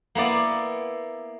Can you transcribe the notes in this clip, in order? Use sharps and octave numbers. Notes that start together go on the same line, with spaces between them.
A#3 B3 E4 D5